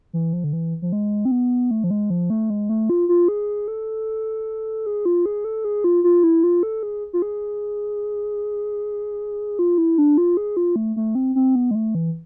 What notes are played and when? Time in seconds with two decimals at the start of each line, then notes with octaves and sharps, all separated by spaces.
0.13 E3
0.33 F3
0.44 D3
0.53 E3
0.82 F3
0.92 G#3
1.25 C4
1.31 B3
1.71 A3
1.84 F3
1.91 G#3
2.10 F3
2.30 A3
2.50 G#3
2.69 A3
2.90 F4
3.09 F4
3.28 G#4
3.68 A4
4.86 G#4
5.05 F4
5.26 G#4
5.45 A4
5.65 G#4
5.84 F4
6.04 F4
6.23 E4
6.43 F4
6.63 A4
6.83 G#4
7.13 F4
7.22 G#4
9.59 F4
9.78 E4
9.98 D4
10.18 F4
10.37 G#4
10.57 F4
10.76 A3
10.96 A3
11.15 C4
11.35 C4
11.55 B3
11.71 G#3
11.75 A3
11.95 E3